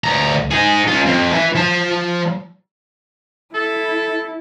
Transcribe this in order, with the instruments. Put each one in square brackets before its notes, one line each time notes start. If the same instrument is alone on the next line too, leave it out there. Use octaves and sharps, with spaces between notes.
[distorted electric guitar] D2 A#5
D#4 G#4
C#4 F4
F2
E3 E5
F3 A5
[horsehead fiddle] E4 [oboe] A4